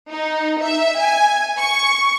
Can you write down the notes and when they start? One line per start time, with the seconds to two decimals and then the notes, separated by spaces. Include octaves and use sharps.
0.12 D#4
0.62 E5
1.01 G#5
1.59 C#6